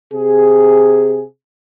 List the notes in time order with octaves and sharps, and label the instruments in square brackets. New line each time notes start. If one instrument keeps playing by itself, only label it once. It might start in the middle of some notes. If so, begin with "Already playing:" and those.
[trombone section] C3 G#4